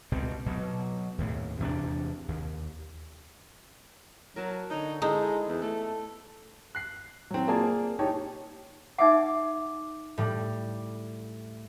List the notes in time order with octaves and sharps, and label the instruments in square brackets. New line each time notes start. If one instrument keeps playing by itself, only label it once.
[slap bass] C#2 B2 G3 C4
B2 F#3
D#2 A2
E2 C3 A#3 D4
D#2
[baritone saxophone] F#3 [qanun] A#4 G#5 A5
[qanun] D3 C#5 [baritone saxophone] D#4
[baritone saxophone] G#3 [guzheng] D#4 [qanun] E4 A4 C5
[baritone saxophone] E2
[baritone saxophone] A3 [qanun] A4
[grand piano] F#6 C7
F#3 C4
A#3 F4 G#4 D5 G#5 A5
D#4 G4 C#5 A5
[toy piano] D#4 E5 F#5 [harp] D6
[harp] A2 G3